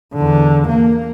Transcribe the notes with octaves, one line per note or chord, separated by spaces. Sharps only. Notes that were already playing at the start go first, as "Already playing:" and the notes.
E2 D3
A#3